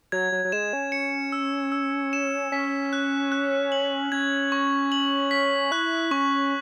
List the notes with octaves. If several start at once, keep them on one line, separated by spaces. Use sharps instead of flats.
F#3 G#6
F#3
F#3
G#3 E7
C#4
C#7
E6
E6
E7
C#4 B6
F#6
F#6
F#7
C#4 G#6
C#6
F#7
B6
E4 F#6
C#4 C#6